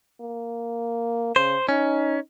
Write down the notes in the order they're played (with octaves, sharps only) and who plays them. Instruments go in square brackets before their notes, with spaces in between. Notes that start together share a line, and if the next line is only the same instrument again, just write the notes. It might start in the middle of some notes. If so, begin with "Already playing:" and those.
[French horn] A#3
[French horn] C#3 [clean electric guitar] C5
[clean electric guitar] C#4 [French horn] D#4